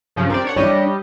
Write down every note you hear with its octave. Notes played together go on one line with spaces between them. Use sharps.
G2 C#3 F3
C4 G4 A#4 D5
D4 C#5 F#5
G3 D4 E4 G4 C#5 D#5